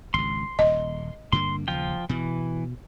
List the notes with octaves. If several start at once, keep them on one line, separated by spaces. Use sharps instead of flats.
G#1 C#2 C6
D#1 D#5
G2 D3 A#3 C6
D#2 C#3 F3 F4 G5
B2 E3